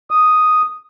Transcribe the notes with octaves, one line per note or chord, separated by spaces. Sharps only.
D#6